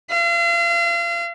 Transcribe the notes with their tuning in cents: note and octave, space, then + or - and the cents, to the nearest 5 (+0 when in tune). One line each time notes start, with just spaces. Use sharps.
F5 -40